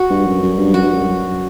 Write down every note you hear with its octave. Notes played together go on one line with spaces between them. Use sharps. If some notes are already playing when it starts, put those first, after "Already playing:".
Already playing: F#4
G2
F#2
F#2
G2
F#2 F#4
G2
F#2